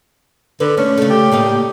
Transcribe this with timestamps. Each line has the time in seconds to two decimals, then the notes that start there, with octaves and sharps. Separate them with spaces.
0.60 D3 B4
0.77 A3 C#4
0.98 C#3 A3
1.10 G4
1.32 A2 A#3 D#4